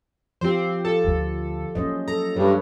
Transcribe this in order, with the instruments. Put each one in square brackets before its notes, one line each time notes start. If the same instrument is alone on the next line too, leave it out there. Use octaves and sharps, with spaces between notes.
[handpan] F3 F4 G4 [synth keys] C4 C5
[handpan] F4 [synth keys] A4
[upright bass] D2 D3
[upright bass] F#3 A#3 [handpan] C#4 C5 D#5
[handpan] A4 [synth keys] A#5
[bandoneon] G2 [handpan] B4 C#5